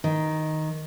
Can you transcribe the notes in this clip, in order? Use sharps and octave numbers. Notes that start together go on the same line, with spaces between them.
D#3